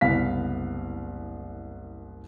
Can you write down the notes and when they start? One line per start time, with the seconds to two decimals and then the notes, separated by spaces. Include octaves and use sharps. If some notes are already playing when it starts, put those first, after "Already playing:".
0.01 F#1 C2 B3 F5 B6